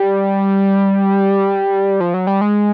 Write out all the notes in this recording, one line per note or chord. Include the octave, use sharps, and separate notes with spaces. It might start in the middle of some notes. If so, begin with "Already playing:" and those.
Already playing: G3
F3
F#3
G3
G#3